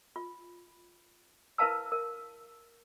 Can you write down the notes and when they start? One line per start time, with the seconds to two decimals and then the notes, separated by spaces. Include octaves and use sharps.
0.16 F4
1.58 E4 A#4 B4 F5 A5 E6
1.92 A#4